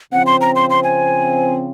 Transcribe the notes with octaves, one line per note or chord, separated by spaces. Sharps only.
C#3 F3 C4 F#5
C6
A#5
C6
C6
G#5